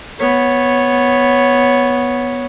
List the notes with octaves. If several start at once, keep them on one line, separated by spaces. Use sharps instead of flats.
B3 C#5